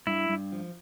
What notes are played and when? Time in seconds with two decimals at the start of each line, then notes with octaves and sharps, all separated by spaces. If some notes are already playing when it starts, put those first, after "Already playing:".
0.07 G2 E4
0.29 G2
0.52 F3